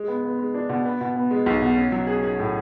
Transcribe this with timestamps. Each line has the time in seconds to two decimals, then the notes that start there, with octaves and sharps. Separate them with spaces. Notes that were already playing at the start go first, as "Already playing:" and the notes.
Already playing: G#3
0.08 B3
0.24 B3
0.39 G#3
0.54 D4
0.69 B2
0.85 B3
1.01 B2
1.16 B3
1.31 G#3
1.46 B1
1.62 B2
1.77 C#4
1.92 F#3
2.07 G#4
2.23 G#4
2.39 A2